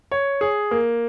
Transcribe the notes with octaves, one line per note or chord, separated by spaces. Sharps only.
C#5
G#4
A#3